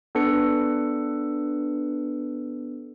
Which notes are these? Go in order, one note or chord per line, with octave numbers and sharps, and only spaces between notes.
B3 D4 A4 B4 C#7